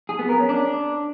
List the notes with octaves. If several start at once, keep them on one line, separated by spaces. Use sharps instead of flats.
G#4
B3
A#4
C#4
D4